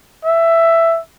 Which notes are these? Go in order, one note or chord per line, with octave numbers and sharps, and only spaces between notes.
E5